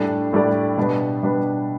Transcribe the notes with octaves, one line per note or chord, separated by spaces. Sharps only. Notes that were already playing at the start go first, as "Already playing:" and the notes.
Already playing: A2 G3 D4 A4 D5
A2 G3 D4 A4 D5
B2 G3 D4 B4
B2 G3 D4 B4